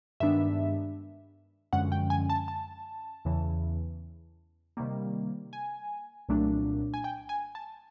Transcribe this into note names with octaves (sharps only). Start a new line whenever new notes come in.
G2 D#3 G#3 B3 D4 E5
F#2 D3 F3 G#3 C#4 F#5
G5
G#5
A5
A5
E2 C#3 E3
C3 D#3 G3 A#3
G#5
C2 A#2 F#3 A3 D4
G#5
G5
G#5
A5